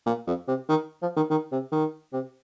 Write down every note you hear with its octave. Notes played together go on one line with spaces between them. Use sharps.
A#2
F2
C3
D#3
F3
D#3
D#3
C3
D#3
C3